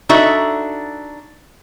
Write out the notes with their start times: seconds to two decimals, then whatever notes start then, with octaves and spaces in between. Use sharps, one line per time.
0.09 D4 D#4 F#4 A4 D5 E5